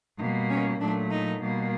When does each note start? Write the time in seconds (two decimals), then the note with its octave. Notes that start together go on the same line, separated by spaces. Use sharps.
0.19 B2 G3 A#3 D#4
0.49 C#4
0.79 A#2 F#3 A3 D4
1.10 D#4
1.41 B2 G3 A#3